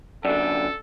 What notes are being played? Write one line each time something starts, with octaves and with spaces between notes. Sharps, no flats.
F#2 D3 A4 D5